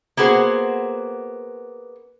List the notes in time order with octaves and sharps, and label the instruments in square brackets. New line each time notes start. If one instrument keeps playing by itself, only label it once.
[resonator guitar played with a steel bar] A#3 B3 F#4 G#4 C5